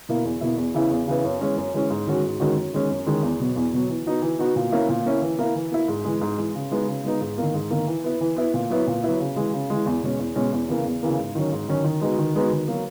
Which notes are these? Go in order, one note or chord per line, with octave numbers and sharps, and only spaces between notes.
B2 A#3 E4
E2
B2 A#3 E4
E2
C#3 E3 B3 E4
E2
C#3 E3 B3 E4
F#2
E3 G#3 C#4
F#2
E3 G#3 C#4
G#2
D#3 G#3 C#4 F#4
G#2
D#3 G#3 C#4 F#4
F#2
D#3 G#3 C#4
F#2
D#3 G#3 C#4
E2
B2 F#3
E2
B2 F#3
E3
B3 D#4 F#4
E3
B3 D#4 F#4
A#2
A#3 C#4 E4
A#2
A#3 C#4 E4
E3
A#3 E4
E3
A#3 E4
G#2
E3 G#3
G#2
E3 G#3
C#3
G#3 B3 D#4
C#3
G#3 B3 D#4
G#2
D#3 A#3
G#2
D#3 A#3
E3
B3 E4
E3
B3 E4
A#2
F#3 B3 E4
A#2
F#3 B3 E4
C#3
E3 G#3
C#3
E3 G#3
E2
B2 G#3 C#4
E2
B2 G#3 C#4
E2
C#3 E3 A#3
E2
C#3 E3 A#3
G#2
D#3 F#3 C#4
G#2
D#3 F#3 C#4
D#3
G#3 B3 D#4 F#4
D#3
G#3 B3 D#4 F#4
D#3
F#3 A#3